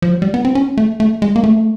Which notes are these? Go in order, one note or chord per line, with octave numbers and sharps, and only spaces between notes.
F3
F#3
G3
B3
C4
C#4
A3
A3
G#3
A#3
A3